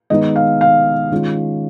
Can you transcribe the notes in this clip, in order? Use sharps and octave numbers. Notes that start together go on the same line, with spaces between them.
D#3 G#3 B3 D#4 D#5
F5
F5
D#3 G#3 C#4 F4